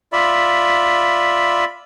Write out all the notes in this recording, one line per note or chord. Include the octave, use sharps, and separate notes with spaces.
F4 D5 E5 B5